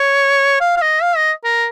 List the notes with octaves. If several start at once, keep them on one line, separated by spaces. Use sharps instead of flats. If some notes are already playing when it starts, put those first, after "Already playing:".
Already playing: C#5
F5
F5
D#5
F5
D#5
A#4